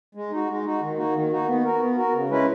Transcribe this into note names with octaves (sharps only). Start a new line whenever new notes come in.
G#3
D#4 F#4
G#3
D#4 F#4
D#3
A#3 D#4 F#4
D#3
A#3 D#4 F#4
B3
F#4 A#4
B3
F#4 A#4
C#3
G#3 C#4 E4 B4